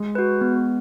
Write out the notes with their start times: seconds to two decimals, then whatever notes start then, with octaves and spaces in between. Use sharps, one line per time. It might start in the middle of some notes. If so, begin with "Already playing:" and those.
Already playing: G#3
0.15 F#4 B4
0.41 B3